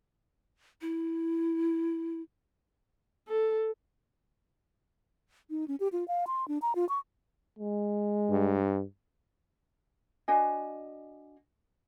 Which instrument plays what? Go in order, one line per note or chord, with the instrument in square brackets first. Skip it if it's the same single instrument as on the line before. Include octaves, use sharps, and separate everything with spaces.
[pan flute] E4
[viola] A4
[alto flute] D#4
C#4
G4
F4
F5
C6
D4
A#5
F4
C#6
[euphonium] G#3
[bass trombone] G2
[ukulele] D4 F#4 D#5 G#5